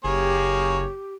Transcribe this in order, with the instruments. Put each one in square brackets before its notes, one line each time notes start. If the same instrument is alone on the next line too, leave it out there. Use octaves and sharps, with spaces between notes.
[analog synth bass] F#1 [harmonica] A#3 G#4 C#5 [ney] G4